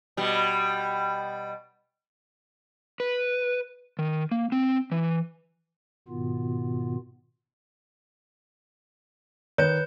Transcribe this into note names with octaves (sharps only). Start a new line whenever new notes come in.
B2 G3
B4
D#3
A#3
C4
E3
G#2 B2 D#3 B3 F4
D#3 B4 C#5 G6